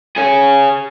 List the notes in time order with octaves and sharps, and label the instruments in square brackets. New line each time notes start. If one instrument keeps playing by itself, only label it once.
[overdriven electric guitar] G#4 C#5